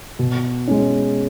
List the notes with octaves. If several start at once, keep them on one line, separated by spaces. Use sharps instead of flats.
B2
G#3 C#4